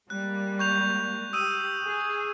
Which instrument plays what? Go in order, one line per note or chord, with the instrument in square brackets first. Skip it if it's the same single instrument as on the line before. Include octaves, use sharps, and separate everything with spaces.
[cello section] G3 G#3 A#3 [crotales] F#6
[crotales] C#6 G6 F7
[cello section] G4 [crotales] D#6 E6 D#7
[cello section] G#4